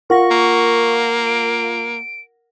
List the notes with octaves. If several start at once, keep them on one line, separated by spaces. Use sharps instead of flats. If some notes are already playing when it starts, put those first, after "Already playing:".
F4 A#4 F#5 C#6 A#6
A#3
D7